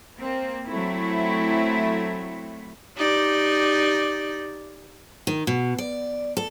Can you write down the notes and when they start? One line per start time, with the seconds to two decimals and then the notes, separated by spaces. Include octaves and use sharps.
0.18 A#3 C4
0.66 F#3 A3 C4 E4
2.97 D#4 G4 D5
5.27 D#3
5.47 B2
5.78 D5
6.37 A4